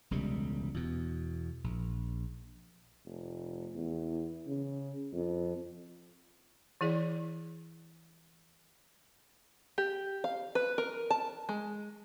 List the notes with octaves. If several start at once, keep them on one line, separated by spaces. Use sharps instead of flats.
E1 C#2 C3 G3
E2 B2
A#1
F1
E2
C#3
F2
E3 E4 G#4 D5
G4
F5
B4
A#4
A5
G#3